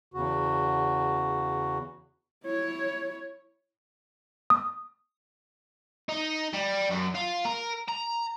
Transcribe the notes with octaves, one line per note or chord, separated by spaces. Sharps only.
E2 C#3 F#4
E4 C#5
D#6
D#4
G3
F#2
F4
A#4
A#5